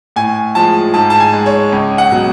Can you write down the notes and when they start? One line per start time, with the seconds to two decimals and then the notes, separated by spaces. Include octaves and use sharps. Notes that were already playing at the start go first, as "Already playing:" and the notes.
0.16 A2 G#5
0.55 F3 G#3 A5
0.94 G#2 A5
1.10 A5
1.20 G#5
1.33 G#3
1.46 C#5
1.72 C#2
1.98 F#5
2.11 B2 F#3